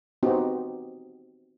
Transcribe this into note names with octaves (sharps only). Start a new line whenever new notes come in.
B3 C4 D#4 F#4 G4